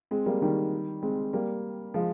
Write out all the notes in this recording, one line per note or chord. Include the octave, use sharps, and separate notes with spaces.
G#3 C4
G3 A#3
D#3 G3
G#3 C4
G3 A#3
F3 G#3